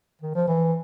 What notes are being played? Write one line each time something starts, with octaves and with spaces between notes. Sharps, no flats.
D#3
F3
E3